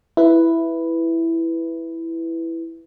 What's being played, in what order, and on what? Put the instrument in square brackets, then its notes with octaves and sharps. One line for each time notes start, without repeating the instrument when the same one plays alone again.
[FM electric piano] E4 B4